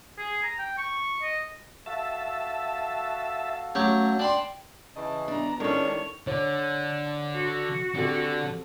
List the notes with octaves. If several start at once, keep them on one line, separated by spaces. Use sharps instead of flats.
G#4
A#5
G5
C#6
D#5
F#4 A4 E5 F5 A5
F#3 A3 C#4 G4 C#6
D4 G5 B5 C6
C#3 E3 D#5 A5
B3 D4 A#5
D#3 G#3 C#4 D4 E4 A4 A#4 C#5
D3 C#5
F#4
D3 C4 G4 A4